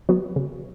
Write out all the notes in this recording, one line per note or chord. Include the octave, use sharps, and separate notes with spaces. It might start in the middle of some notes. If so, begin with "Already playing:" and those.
F#3 B3 F#4
C#3